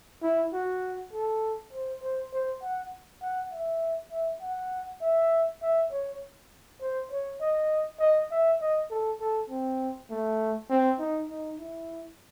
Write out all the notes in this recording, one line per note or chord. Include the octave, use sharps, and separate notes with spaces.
E4
F#4
A4
C5
C5
C5
F#5
F#5
E5
E5
F#5
E5
E5
C#5
C5
C#5
D#5
D#5
E5
D#5
A4
A4
C4
A3
C4
D#4
D#4
E4